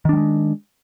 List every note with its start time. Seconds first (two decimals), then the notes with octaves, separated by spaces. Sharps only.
0.05 D#3
0.09 D4
0.13 G3
0.17 G#3